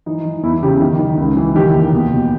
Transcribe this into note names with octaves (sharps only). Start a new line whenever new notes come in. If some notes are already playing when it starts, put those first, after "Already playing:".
E3 D#4
E3
E2 E4
C#3 G4
D#3
D#3
C#2
E3
D#3 G4
D#2
B2
B2